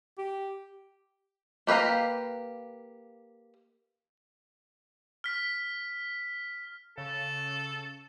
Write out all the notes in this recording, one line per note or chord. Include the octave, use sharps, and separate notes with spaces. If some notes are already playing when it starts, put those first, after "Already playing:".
G4
A#3 G4 B4 F5 A#5
F6 B6
C#3 A4